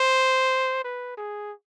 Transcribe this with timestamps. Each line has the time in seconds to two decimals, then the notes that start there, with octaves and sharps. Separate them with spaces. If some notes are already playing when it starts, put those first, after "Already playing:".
Already playing: C5
0.84 B4
1.18 G#4